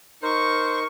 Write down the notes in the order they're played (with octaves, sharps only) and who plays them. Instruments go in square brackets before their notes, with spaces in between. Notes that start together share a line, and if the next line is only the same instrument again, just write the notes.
[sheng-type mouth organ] D#4 A#4 [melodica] C5 [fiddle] C#6